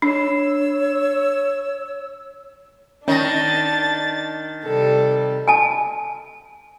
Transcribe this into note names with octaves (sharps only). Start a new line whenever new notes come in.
D4 C#5 E6
D#3 C#4 D4 A6 A#6
C3 G3 A4
G#5 A5